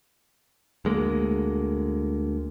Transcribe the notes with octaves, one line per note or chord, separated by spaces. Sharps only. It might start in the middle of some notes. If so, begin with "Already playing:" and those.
D2 G#3 A#3